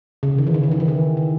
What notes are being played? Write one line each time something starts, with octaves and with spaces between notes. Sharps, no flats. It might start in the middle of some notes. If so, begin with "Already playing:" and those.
C#3
D#3
E3
D#3
E3
D#3
E3
D#3
D#3